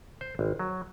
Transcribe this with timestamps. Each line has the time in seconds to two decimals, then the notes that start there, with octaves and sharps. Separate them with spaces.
0.21 C5
0.39 G#1
0.59 F#3